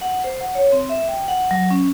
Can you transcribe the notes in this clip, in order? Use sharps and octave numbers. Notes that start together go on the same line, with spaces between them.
F#5
C5
F#5
C#5
C4
E5
G5
F#5
F#3
C#4